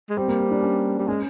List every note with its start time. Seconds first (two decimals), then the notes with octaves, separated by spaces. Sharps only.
0.10 G#3
0.17 G3 C4
0.28 A#3
0.40 C4
0.51 D4
0.62 C#4
0.99 G3
1.08 G#3 C#4